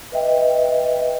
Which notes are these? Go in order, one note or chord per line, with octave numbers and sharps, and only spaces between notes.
B4 D#5 E5 G5